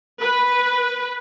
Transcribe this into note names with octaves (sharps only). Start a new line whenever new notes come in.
B4